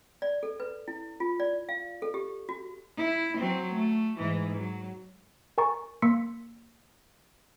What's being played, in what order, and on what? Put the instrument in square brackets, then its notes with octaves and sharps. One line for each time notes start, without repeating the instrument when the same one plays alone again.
[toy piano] D5
A4
B4
E4
F4
D5
F5
A4
G4
F#4
[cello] E4
F#3 C4
A3
G#2 E3
F#3
[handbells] A#4 G#5 A#5 C#6 A6
A#3 C6 E6 B6 C#7